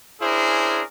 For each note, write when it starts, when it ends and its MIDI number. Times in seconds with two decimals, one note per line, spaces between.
0.22 0.83 61
0.22 0.83 62
0.22 0.83 64
0.22 0.83 68
0.22 0.83 70
0.22 0.83 72